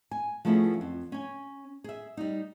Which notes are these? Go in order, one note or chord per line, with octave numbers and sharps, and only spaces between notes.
G#5
F3 A3 B3 C#4 E4 G#4
F2
C#4 G#5
G#4 E5
G3 D#4